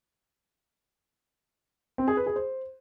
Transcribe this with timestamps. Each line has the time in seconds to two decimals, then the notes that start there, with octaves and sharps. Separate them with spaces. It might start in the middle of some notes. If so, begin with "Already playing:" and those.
1.98 C4
2.08 G#4
2.17 B4
2.26 G#4
2.36 C5